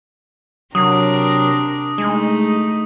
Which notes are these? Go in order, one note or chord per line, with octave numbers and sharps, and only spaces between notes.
C3 F#3 D4 A#4 D#6
G#3 A3 D#4